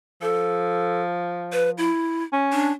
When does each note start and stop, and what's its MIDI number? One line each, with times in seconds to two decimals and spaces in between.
0.22 1.88 53
0.22 1.02 69
1.53 1.70 71
1.78 2.23 64
2.33 2.71 61
2.52 2.72 62